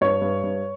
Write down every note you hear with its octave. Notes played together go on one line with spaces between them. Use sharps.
G2 C#5
G2
G2